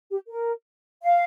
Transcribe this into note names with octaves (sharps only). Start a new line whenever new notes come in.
G4
A#4
F5